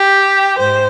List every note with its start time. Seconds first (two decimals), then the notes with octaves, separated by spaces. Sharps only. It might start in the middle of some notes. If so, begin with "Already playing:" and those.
Already playing: G4
0.58 G#2 C5